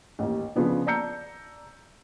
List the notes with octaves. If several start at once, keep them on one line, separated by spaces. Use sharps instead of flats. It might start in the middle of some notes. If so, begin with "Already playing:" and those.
A1 D#2 G4
C#3 F3 B3 D4
D5 A5 A#5 E6 G6 C#7